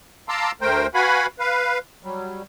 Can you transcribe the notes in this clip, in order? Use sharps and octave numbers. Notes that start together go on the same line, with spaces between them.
F5 A5 A#5 C6 D6 E6
D2 A3 A#4 C5 G5
F#4 B4 F5 F#5 G#5 B5
B4 F5
F#3 G3